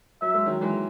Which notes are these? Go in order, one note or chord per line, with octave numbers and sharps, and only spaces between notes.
F#3 E5
G#3
D#3 F#3
E3 G#3